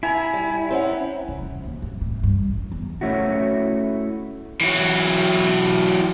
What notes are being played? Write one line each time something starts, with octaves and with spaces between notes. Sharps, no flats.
E4 G#5 A#5
G3
C4 C#4 F#5
C#3
F2
D#2
F2
A2
G2
A1
E2
A3 C#4 E4 F#4
E3 F#3